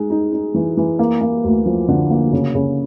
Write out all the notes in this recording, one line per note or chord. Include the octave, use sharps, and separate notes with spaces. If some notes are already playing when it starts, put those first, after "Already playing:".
Already playing: G#3 D#4
D#4
D#4
E3
E3
A#3
A#3
D2
F3
D3
A#3
C#3
C#3